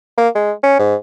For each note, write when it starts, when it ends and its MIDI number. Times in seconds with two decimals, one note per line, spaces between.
0.18 0.29 58
0.35 0.52 56
0.63 0.75 61
0.79 0.95 44